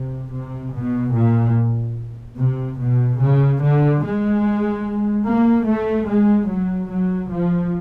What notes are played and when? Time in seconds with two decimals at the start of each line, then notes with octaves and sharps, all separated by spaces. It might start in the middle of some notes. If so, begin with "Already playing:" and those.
Already playing: C3
0.32 C3
0.74 B2
1.14 A#2
2.38 C3
2.79 B2
3.20 C#3
3.62 D3
4.03 G#3
5.27 A#3
5.67 A3
6.09 G#3
6.50 F#3
6.91 F#3
7.32 F3